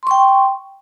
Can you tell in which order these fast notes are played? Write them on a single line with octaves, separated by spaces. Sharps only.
C6 C#6 G5